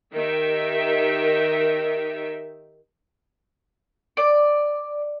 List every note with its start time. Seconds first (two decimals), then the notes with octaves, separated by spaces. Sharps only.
0.14 D#3 D#4 G4 E5 G5
4.17 D5